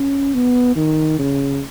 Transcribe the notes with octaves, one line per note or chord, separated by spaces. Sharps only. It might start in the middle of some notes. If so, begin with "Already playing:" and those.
Already playing: C#4
B3
D#3
C#3